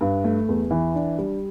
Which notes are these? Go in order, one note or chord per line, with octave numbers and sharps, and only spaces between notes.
G2
A3
E2
E3
D4
G3